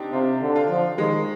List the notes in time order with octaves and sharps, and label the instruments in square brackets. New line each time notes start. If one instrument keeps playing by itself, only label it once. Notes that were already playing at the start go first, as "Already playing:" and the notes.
Already playing: [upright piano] C4 D4 D#4 G4
[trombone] C3 [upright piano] F4
[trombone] D3
[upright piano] F4
[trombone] F3
[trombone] D#3 [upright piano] G#3